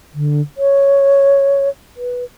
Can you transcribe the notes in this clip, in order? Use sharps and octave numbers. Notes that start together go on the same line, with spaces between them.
D3
C#5
B4